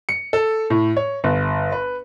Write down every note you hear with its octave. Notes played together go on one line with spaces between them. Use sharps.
C#7
A4
A2
C#5
G1
B4